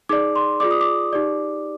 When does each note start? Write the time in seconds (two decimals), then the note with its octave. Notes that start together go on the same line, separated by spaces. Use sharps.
0.09 D#4 G#4 D5 D6
0.36 C6
0.60 F4 G#4 D5 D6
0.71 D#6
0.81 D6
1.13 D#4 G4 D5